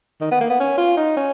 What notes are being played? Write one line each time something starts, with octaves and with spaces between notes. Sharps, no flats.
D#3
B3
A#3
B3
C#4
F4
D#4
C#4